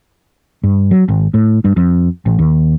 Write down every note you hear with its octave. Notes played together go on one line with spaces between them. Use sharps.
G2
F#3
G#1
A2
G2
F2
A1
D#2